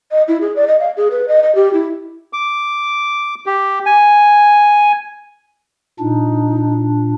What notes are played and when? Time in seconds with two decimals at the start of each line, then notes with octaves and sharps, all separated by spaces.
0.11 D#5
0.28 E4
0.41 G#4
0.56 D5
0.67 D#5
0.80 F5
0.97 G#4
1.11 B4
1.28 D#5
1.43 D#5
1.55 G4
1.73 E4
2.33 D6
3.46 G4
3.86 G#5
5.99 A#2 D4 D#4